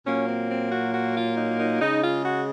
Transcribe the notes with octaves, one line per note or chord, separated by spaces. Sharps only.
A#2 F#3 A#3 C#4
C4
C4
F#4
F#4
F4
D#4
D#4
C#3 G#3 D#4
F4
F#4